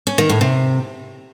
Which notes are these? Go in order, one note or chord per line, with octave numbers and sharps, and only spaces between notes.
C#4
D#3
A2
C3